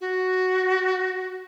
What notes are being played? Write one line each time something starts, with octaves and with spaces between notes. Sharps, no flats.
F#4